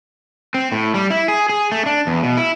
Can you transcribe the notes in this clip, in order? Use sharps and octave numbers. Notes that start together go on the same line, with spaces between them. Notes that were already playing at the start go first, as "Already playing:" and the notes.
C4
A2
G3
E4
G#4
G#4
A3
D4
E2
B2
E4